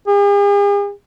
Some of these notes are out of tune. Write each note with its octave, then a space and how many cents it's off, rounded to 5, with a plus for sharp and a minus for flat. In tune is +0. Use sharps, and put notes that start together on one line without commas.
G#4 -45